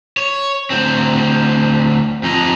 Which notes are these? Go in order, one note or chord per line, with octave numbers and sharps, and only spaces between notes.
C#5
D2 C4
F2 D#4